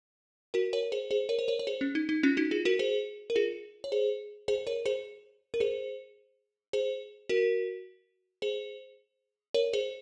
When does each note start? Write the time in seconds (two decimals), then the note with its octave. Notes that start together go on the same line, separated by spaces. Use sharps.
0.54 F#4 A#4
0.73 A#4 C#5
0.92 G#4 C5
1.11 G#4 C5
1.29 A#4 C#5
1.39 C5
1.48 A#4 C#5
1.59 C#5
1.67 G#4 C5
1.81 C#4
1.95 D#4
2.09 D#4
2.23 C#4 F4
2.37 D#4 F#4
2.51 F4 G#4
2.65 F#4 A#4
2.79 G#4 C5
3.30 A#4
3.36 F4 G#4
3.84 C#5
3.92 G#4 C5
4.48 G#4 C5
4.67 A#4 C#5
4.86 G#4 C5
5.54 A#4
5.60 G#4 C5
6.73 G#4 C5
7.29 F#4 A#4
8.42 G#4 C5
9.54 A#4 C#5
9.73 G#4 C5